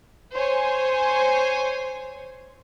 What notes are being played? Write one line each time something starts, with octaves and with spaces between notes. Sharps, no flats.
C5 C#5 G#5